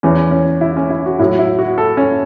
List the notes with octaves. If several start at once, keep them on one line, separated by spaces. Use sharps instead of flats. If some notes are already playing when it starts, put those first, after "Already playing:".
E2 E3 C#4
C#4
E4
C#4
E4
F#4
A2 F#3 E4
E4
F#4
A4
C#4